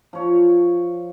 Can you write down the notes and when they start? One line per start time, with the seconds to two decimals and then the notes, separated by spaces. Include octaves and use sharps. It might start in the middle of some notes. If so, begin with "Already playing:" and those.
0.13 F3 C#5